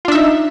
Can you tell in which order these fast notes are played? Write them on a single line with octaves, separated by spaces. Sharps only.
F4 D4 E5 D#4